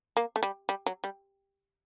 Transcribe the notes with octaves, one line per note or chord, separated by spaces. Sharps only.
A#3
A3
G3
G3
F#3
G3